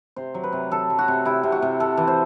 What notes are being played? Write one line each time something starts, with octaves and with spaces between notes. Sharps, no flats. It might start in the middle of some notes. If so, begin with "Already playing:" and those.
C3 C5
F#3
B4
C3
F#3 A4
F#3
F#4
C3
C3 E4
C3
F#4
C3
C3 A4
E3
C5